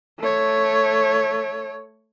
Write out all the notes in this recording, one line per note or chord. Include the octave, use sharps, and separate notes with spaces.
A3 C#5